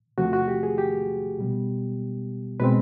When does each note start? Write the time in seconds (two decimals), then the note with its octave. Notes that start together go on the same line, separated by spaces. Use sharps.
0.18 E2 C3 F3 A3 F#4
0.33 F#4
0.48 G4
0.63 G#4
0.78 G4
1.38 B2 G3 B3
2.60 B2 G#3 C4 B4